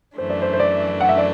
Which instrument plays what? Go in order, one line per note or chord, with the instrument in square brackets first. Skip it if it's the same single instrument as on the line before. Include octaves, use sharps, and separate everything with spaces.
[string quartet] F#2 E3 A3 D4 [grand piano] C5
[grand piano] D5
C5
C5
D5
F#5
E5
D5